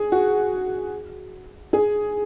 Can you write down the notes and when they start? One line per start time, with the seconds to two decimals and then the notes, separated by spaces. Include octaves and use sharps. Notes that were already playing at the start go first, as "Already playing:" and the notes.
Already playing: G#4
0.12 F#4
1.73 G#4